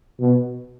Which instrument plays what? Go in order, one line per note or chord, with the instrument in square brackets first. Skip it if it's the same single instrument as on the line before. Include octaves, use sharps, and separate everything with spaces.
[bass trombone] B2